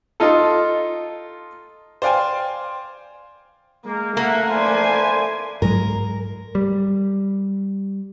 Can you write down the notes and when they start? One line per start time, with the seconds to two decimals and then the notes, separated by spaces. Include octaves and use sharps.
0.20 D#4 F4 A4
2.02 C5 D5 F5 G5 G#5
3.85 G#3 A#3
4.17 A3 A#3 E5 F#5
4.50 B4 C5 D5 G#5 C6
5.62 G#2 F#3 G#3 A#4
6.55 G3